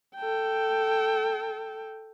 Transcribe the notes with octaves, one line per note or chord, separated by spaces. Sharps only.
A4 G5